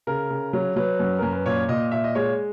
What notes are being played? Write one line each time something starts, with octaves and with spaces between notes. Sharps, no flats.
C#3 A#4
C#3
F#3
F#3 B4
F#2
F#2 A#4
B4
A#2 C#5
A#2 D#5
A#2 E5
D#5
G#3 C#5